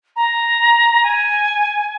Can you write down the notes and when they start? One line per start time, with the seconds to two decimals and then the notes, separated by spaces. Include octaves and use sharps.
0.16 A#5
1.03 G#5